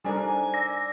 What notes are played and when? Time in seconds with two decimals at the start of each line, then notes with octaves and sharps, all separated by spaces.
0.05 G3 D4 D#4 A4 A#4 C5 G#5
0.54 D5 D6 E6 A#6